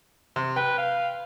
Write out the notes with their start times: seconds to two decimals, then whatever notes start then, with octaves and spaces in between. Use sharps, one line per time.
0.36 C3
0.56 B4 G5
0.78 F5